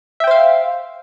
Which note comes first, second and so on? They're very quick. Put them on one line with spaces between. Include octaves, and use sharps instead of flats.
E5 G5 C5 F5